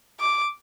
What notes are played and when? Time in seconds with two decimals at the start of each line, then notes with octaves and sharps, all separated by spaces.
0.20 D6